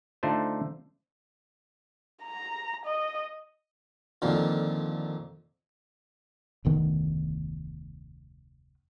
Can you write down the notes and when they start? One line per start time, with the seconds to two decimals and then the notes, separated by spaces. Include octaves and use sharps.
0.23 D3 A3 D4 D#4 F4 C5
2.23 A#5
2.86 D#5
4.22 F2 A#2 D3 D#3
6.65 F1 D2 D#3 B3